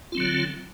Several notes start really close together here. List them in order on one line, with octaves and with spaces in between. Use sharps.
F4 C4 F#3 D3